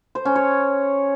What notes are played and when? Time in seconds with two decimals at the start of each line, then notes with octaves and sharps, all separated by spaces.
0.15 C5
0.25 C#4
0.36 C#5